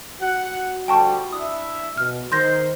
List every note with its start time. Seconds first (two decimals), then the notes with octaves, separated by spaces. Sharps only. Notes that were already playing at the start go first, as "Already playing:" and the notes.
0.21 F#4 F#5
0.88 D3 F3 G3 G5 A5 C#6
1.32 D4 E4 E5 D#6
1.98 B2 F6
2.32 D#3 D#4 A#4 C5 C6 G6 A#6